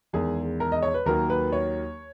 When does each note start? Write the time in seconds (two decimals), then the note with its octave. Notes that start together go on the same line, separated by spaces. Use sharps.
0.13 E2 D#3 G#3 G#4
0.60 A#4
0.72 D#5
0.83 C#5
0.94 B4
1.06 D#2 D#3 F#3 A#3 A#4
1.30 B4
1.52 C#5